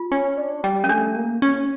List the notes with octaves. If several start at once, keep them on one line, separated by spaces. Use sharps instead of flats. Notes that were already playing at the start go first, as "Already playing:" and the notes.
Already playing: F4
C#4
D4
G3
C#4
A3 D4
A#3
C#4